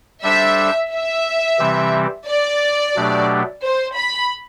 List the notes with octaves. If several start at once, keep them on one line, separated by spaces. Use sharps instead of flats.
G3 D4 A4 C5 E5
E5
C3 E3 G3 C4 G4
D5
B2 F#3 A3 D4 G4
C5
B5